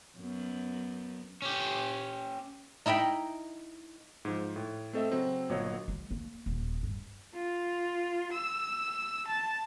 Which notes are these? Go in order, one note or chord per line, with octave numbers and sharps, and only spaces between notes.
F#2 B3
C#4 G4
D#4 E4 D#5 G5 B5
G#2 F3
A2
A3 C4 A4 D#5 E5
C#3 F#3 C4
G1 A#2 F#3 C#5 D#5
G#3
A#3
D#1
G2
F4
E6
A5